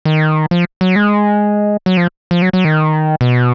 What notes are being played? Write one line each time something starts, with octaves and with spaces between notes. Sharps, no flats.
D#3
F3
F#3
G#3
F#3
F3
F3
F#3
F#3
D#3
B2